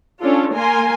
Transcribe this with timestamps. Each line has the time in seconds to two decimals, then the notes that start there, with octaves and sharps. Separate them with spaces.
0.21 C#4 D4 F4 A4
0.55 A#3 A#4 G#5 C6